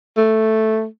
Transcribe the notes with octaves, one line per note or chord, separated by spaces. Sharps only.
A3